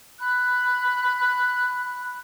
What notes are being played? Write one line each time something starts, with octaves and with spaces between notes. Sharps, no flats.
B5 F#6